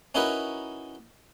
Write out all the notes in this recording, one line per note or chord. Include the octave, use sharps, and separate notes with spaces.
C#4 D#4 E4 F#4 A#4 B4